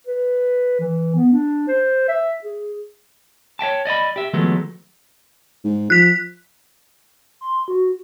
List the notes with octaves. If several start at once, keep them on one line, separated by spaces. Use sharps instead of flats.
B4
E3
B3
D4
C5
E5
G#4
C#5 E5 G5 A5
D5 D#5 F5 B5
G4 E5
D#3 F3 F#3 G#3 A3 B3
G#2
F3 F#6 B6
C6
F#4